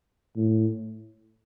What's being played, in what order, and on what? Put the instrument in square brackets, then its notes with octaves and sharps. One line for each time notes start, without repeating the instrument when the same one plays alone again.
[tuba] A2